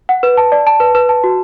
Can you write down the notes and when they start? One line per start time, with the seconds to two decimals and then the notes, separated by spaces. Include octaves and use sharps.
0.09 F#5
0.23 B4
0.37 A5
0.52 D5
0.67 A5
0.80 B4
0.95 B4
1.09 A5
1.24 F#4